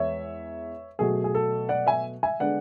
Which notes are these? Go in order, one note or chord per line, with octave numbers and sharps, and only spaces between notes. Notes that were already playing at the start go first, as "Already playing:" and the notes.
Already playing: E2 E3 G#3 B3 C#5 E5
B2 F#3 A3 G#4
G#4
A4
D5 F#5
E5 G#5
E5 G#5
D3 G#3 B3 D5 F#5